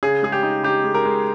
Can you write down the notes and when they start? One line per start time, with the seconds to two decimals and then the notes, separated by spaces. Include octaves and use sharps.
0.03 C#3 G#4
0.23 G#3 G#4
0.32 G4
0.43 D#4
0.64 D#4 G4
0.84 G#3
0.94 A#4
1.05 G#3